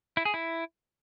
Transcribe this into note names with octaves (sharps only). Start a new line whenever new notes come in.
E4
G#4
E4